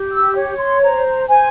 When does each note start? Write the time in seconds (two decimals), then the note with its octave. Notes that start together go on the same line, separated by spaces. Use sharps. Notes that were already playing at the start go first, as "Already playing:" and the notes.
Already playing: G4
0.12 E6
0.35 C#5
0.58 C6
0.81 C5 A#5
1.28 C5 G#5